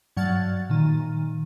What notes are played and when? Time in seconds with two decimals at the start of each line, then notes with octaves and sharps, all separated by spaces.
0.17 G2 F#3 F#5 F6 A6
0.70 A#2 D#3